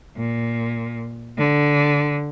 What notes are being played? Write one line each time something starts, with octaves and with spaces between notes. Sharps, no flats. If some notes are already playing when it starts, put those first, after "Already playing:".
A#2
D3